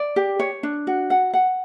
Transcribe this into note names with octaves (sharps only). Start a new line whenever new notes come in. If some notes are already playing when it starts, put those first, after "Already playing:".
Already playing: D5
G4
C#5
D4
F#4
F#5
F#5